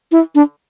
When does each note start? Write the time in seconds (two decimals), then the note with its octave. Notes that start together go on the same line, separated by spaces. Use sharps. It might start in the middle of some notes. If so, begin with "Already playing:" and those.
0.12 E4
0.35 D4